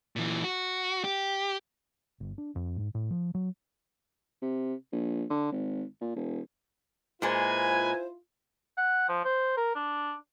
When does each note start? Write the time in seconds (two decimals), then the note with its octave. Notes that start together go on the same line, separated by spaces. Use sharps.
0.16 A#2 E3
0.44 F#4
1.04 G4
2.20 G1
2.38 D4
2.55 F2
2.77 G#2
2.95 A2
3.11 F3
3.35 F#3
4.42 C3
4.92 A#1
5.30 D3
5.52 G#1
6.01 A#2
6.16 E1
7.22 A#2 G#3 E4 F4 B4 C5 G#5
8.77 F#5
9.09 F3
9.25 C5
9.57 A#4
9.75 D4